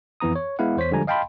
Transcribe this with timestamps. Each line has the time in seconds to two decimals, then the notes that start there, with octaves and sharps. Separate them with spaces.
0.20 F2 E3 B3 A#5 D#6
0.36 C#5
0.59 G#3 B3 E4 F5 F#5
0.77 E2 C5 C#5 B6
0.91 D3 F3 G3 G#3 G#5 A#5
1.07 D#5 F5 G5 A5 B5 C6